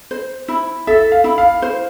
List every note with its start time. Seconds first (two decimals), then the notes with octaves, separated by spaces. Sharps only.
0.11 C5
0.48 E4
0.87 A4 E5
1.12 F5
1.24 E4
1.38 F5
1.62 C5